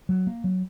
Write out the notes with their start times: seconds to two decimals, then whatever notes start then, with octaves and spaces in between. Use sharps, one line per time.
0.09 F#3
0.27 A#3
0.44 F#3